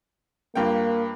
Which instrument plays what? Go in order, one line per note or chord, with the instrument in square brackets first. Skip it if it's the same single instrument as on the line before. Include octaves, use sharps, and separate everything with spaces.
[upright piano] G2 F4 G5 [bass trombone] A#3